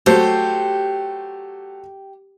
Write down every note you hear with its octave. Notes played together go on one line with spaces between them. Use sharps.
F#3 A3 G4 C5